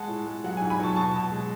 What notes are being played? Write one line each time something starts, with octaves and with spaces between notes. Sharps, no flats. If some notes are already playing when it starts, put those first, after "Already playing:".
Already playing: G#3 F#5 A5
A2
G#3
F#3 F#5
G#5
G#2
G#5 B5
F#3 A5 C#6
B2 A5 C#6
B2
G#3